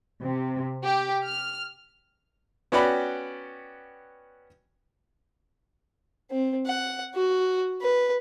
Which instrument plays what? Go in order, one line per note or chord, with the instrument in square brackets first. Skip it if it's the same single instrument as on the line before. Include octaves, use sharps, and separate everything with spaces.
[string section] C3
G4
F6
[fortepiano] B3 C#4 F#4 D5 G5 B5
[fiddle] C4
F#5
F#4
B4